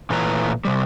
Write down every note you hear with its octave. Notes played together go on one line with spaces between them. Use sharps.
A#2 E3 A3 B4 C#5 A#5
C3 G3